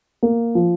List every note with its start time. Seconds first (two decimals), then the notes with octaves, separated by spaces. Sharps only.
0.23 A#3
0.55 F3